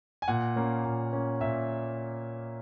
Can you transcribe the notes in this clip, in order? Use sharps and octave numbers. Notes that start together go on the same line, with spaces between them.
G#5
A#2 F#5
A#3 C#4
A#2
A#3 C#4
A#2 E5